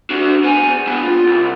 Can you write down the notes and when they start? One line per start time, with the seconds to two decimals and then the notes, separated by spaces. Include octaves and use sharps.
0.10 D4 F#4
0.43 B3 G#5
0.87 B3 D4
1.03 F4
1.27 C2